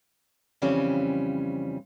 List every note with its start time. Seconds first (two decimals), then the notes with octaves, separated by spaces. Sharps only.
0.62 F2 C#3 E3 G3 C4 C#4